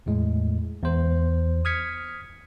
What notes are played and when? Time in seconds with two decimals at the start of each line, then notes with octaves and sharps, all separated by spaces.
0.06 E2 A2 G#3
0.83 E2 C5
1.65 D#6 F6 G#6 B6 C#7